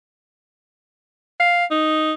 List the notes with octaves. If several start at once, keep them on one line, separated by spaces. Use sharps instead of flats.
F5
D#4